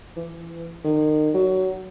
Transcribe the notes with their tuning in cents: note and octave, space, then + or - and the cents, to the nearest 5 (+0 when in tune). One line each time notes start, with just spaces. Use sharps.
E3 +25
D#3 -30
F#3 +20